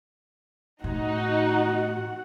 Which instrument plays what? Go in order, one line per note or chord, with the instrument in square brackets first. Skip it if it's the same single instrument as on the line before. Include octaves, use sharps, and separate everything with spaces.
[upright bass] A2 [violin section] D#4 [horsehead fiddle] F#4 F#5